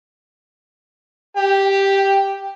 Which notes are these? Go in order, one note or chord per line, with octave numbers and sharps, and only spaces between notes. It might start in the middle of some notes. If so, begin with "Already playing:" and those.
G4